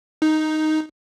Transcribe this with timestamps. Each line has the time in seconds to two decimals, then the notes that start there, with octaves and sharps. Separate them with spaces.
0.22 D#4